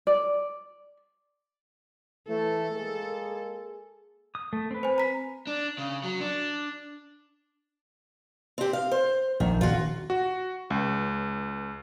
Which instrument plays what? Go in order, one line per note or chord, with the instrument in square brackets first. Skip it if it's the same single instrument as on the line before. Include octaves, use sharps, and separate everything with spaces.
[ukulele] D5
[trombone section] E3 A3 [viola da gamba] A4
[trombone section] G#3 A#3 G#4
[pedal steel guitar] D#6
A3
C4 B4
[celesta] C5 G#5
A#5 B6
[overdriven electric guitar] D4
C#3
F#3
D4
[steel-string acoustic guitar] C4 G4
F5
C5
[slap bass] A#1 [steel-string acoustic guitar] D#3
[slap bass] D#1 [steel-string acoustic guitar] F4 F#4
[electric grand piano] F#4
C#2